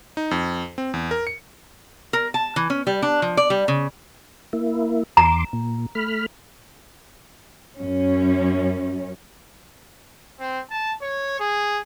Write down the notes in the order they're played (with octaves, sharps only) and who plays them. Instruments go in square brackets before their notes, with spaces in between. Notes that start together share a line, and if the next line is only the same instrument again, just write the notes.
[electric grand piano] D#4
F2
C4
E2
A#4
C#7
[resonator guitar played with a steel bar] A#4
A5
E3
C#4
G3
D4
F3
D5
G3
C#3
[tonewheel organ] A#3 E4
[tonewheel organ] E2 C6 D6 [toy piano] A#5
[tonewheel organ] A#2
A3 B5 F6
[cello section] F#2 C#4
[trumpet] C4
A5
C#5
G#4